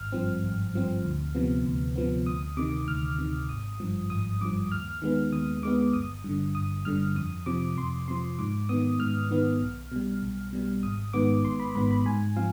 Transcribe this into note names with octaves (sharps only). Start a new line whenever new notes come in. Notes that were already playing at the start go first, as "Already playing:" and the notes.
Already playing: G#1 F6
G2 F3 C4
G#1
G2 F3 C4
D2
C3 F3 B3
D2
C3 F3 B3
D2 D#6
C3 D#3 D6
D2 F6
C3 D#3
G#1 D#6
G2 F3
G#1 D#6
G2 F3 D6
D#2 F6
D#3 G#3 B3
D#2 D#6
D#3 G#3 B3 D6
G1 D#6
G2 D3
G1 D#6
G2 D3 F6
F2 D#6
C3 F3 D6
F2 C6
C3 F3 C6
G#2 D6
D#3 B3 D#6
G#2 F6
D#3 B3
B1
B2 G3
B1
B2 G3
G#1 D#6
G#2 D#3 B3 D6
G#1 C6
B5
G#2 D#3 B3 B5
B5
G#2 G#5
F3 C4 F5